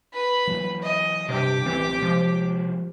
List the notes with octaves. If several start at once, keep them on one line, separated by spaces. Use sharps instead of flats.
B4 B5
E3 F#3 A#3
D#5
G2 C3 G4 D6
A1 E3 C4
C3 F3 G#3